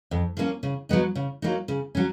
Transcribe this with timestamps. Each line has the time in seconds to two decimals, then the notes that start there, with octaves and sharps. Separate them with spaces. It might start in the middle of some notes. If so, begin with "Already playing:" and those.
0.11 F2
0.37 F3 A#3 C#4
0.63 C#3
0.89 F#3 B3 D#4
1.15 C#3
1.42 F#3 A#3 D#4
1.68 C#3
1.95 F#3 C#4